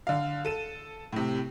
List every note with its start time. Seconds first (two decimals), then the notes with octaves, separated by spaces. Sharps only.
0.07 D3 F5
0.45 A4 D#7 E7
1.13 A2 C3